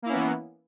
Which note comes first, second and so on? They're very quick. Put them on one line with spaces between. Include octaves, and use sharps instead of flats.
A#3 E4 C#4 B3 E3